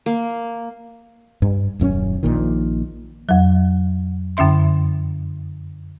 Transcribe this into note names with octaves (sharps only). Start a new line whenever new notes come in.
A#3
G2
D#1 F#2 C4 C#4
A#1 A#2 D#3
F2 F#3
F#2 D3 C#4 E5 C6